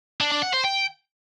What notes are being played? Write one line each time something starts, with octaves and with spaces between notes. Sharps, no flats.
D4
D4
F#5
C5
G5